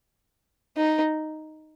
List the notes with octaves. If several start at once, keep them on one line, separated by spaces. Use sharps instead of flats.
D#4